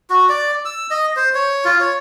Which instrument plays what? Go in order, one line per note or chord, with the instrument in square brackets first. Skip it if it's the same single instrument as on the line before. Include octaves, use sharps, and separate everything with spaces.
[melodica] F#4
D5
E6
D#5
C5
C#5
F4
C#5